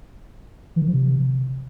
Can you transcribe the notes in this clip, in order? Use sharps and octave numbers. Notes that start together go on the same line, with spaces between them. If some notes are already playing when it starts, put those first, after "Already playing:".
E3
D#3
F3
C3